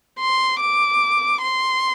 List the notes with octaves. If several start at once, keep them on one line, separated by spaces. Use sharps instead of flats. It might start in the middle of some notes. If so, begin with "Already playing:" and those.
C6
D6
C6